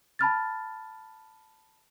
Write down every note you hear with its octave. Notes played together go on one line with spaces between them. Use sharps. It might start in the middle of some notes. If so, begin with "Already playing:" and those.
A5 B5 F6 A6